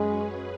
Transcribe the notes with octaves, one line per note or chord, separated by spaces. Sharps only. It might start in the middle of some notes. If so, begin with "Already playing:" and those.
Already playing: F#2 F#3 G#3 C#4 G#4 B4